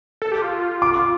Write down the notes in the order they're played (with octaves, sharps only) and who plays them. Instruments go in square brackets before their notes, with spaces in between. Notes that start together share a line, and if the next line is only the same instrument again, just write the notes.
[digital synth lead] A4
G4
F4
[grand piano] D6